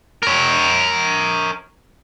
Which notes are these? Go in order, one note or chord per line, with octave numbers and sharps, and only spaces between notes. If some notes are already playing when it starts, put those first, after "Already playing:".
A#4 C#5